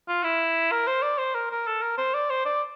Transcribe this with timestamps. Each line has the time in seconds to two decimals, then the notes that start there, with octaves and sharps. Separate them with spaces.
0.08 F4
0.24 E4
0.72 A#4
0.87 C5
1.03 D5
1.19 C5
1.35 A#4
1.51 A#4
1.67 A4
1.82 A#4
1.98 C5
2.14 D5
2.30 C5
2.45 D5